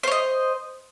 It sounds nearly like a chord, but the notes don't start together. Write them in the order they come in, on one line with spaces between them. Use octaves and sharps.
C5 C#5 D#5